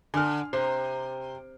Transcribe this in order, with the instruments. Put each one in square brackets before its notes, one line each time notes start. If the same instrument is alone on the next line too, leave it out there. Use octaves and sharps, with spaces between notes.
[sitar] D3 [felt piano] G#5 F6
[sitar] C3 [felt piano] C5